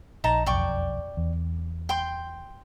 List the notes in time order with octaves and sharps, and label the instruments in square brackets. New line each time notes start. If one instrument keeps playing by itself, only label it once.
[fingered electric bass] A#1 [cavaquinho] D#4 A5 A#5
[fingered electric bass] E1 B1 F2 [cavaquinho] D5 G5 C#6
[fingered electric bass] E2
[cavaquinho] G5 C6